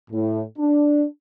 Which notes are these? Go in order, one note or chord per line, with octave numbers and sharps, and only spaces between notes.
A2
D4